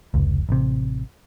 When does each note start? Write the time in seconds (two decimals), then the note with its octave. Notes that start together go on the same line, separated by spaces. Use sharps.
0.14 F1 C#2
0.49 A1 C3